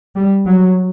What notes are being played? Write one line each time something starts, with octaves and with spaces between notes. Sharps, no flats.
G3
F#3